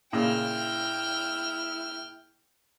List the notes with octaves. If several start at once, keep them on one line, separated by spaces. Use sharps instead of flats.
A#2 C#3 E4 G5 F6